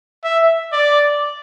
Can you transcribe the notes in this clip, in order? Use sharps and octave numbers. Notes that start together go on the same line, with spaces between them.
E5
D5